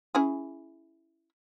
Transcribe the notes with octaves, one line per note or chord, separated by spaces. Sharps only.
C#4 E4 G#4